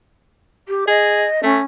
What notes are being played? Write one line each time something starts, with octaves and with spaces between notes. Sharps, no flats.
G4
G#4 D#5
A3 C#4